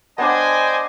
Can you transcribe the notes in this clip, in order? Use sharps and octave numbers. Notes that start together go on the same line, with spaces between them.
B3 D4 C5 D5 D#5 G5 G#5